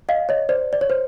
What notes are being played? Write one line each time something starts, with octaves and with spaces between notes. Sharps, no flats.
D#5 F5
C#5 D#5
C5 D5
D5
C#5
C5